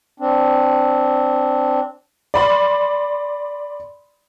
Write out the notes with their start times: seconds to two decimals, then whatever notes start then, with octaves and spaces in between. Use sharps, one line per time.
0.20 C4 D4
2.34 D5 B5 C6